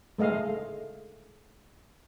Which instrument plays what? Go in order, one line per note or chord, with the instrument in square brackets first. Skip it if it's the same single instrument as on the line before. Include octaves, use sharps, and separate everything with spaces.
[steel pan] G#3 A3 D#5 F5